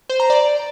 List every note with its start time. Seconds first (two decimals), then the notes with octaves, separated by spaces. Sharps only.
0.10 C5
0.20 A#5
0.30 D5